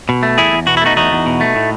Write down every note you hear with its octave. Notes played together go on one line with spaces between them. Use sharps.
B2
A3
E2 E4 G#4
E2
B2 F#4
E4
A3 D#4 F#4
E2 D#4 F#4
E2
B2
A3
A2